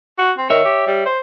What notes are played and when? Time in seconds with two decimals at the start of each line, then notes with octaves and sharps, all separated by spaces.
0.18 F#4
0.38 C4
0.50 D#3 C#5 E5
0.65 G4
0.87 G3
1.06 C5